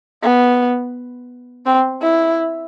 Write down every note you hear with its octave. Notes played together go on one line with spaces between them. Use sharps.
B3
C4
E4